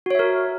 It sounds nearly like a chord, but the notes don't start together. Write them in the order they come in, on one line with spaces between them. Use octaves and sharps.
F#4 C#5 E5 A#4